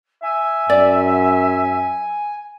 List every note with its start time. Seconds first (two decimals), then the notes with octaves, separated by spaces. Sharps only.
0.23 E5 G#5
0.70 F#2 D5